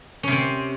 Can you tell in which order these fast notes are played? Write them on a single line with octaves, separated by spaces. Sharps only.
C#4 C3 C4